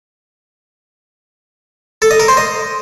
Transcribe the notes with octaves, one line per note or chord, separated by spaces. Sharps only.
A4
D#5
A#4
C5
D#5